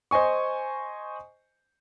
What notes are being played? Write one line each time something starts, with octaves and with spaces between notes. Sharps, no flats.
C5 D#5 G#5 C#6